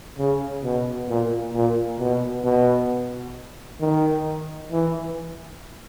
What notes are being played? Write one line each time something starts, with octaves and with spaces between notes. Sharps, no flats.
C#3
B2
A#2
A#2
B2
B2
D#3
E3